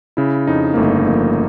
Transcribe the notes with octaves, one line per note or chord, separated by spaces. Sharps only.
C#3 E4
F2 D#4
A#3
G1 A3
F3 A#3